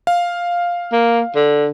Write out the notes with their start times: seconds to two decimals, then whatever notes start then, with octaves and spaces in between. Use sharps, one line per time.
0.07 F5
0.93 A#3
1.36 D3